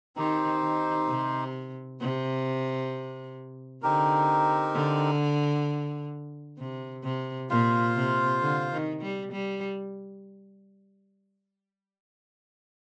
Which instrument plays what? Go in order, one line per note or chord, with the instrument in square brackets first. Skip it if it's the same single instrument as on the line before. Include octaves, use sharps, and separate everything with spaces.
[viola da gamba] D#3 [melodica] C4 D#4 G4 C5
[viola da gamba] D#3
C3
C3
[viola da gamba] D3 [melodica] C4 D#4 G4 A#4
[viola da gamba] D3
C3
C3
[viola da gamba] A#2 [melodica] F4 C5 F5
[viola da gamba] C3
D3
D#3
G3
G3